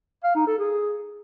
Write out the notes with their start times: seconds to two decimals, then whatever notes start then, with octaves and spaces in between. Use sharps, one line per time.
0.24 F5
0.35 D#4
0.47 A4
0.58 G#4